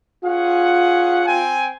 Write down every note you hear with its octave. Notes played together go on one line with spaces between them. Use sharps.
C#4 F4 G#4 F#5
C4 G5 G#5